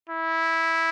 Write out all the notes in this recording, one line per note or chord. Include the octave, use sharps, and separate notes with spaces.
E4